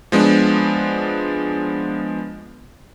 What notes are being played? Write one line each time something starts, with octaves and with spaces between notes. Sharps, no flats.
F3 G#3 B3 D4